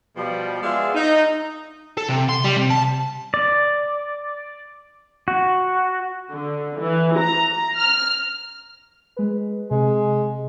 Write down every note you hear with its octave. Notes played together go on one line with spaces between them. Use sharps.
B2 F3 G3
G#3 B3 F4 G#4 D5 E5
D#4
A4
C3
C6
G3
C3
A5
D5
F#4
D3
E3
A#5
F6
G#3 B4
C3 G#3